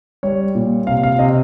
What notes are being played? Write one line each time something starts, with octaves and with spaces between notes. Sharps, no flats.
G3 C#5
A#2
C3 F5
F5
C3 D#5